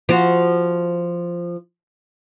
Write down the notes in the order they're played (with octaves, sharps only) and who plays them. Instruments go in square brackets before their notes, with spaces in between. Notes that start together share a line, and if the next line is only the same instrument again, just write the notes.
[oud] F3 F#4